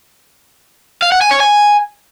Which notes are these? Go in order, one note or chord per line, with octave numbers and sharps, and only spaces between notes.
F5
F#5
G#5
C#5
G#5